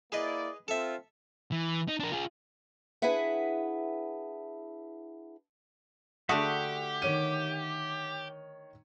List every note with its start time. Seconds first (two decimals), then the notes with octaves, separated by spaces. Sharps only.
0.12 A#3 E4 G#4 B4 D5 D#5
0.68 C4 F4 A4 E5
1.52 E3
1.88 D#4
2.00 D4 A#4
2.12 F4 G#4
3.02 D4 E4 G#4 B4 E5 F#5
6.29 D3 A3 F#4 G4 E5 F#5 D#6
7.02 D#3 C#5 D#7